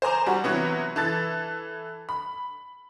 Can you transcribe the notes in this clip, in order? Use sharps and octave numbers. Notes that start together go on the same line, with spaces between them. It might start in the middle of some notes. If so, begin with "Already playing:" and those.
C5 G#5 A#5 D6
G3 F#4
C3 E3 F#3 B3
E3 A4 A6
B5